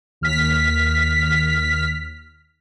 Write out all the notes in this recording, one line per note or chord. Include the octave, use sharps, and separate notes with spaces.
D#2 F6 B6